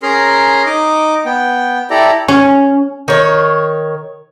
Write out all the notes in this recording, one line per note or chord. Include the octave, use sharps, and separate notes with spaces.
C#4 G#4 A#4 A#5 C6
D#4 D#5 D6
B3 G5
E4 G4 A4 D5 A#5
C#4
D#3 C#5